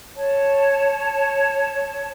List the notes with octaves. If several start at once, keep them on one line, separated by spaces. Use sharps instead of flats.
C#5 A5